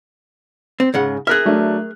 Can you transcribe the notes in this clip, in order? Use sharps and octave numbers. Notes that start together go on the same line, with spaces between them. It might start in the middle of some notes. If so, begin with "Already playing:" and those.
C4
G#2 C#3 F#5
G#4 A#4 E5 F6 F#6
F#3 A3 D4